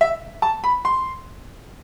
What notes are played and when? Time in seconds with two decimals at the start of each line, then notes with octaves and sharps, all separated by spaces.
0.01 E5
0.42 A5
0.64 B5
0.85 C6